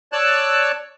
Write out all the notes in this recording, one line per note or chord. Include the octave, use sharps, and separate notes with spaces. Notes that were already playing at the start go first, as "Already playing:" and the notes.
C#5 D5 A5 E6 F#6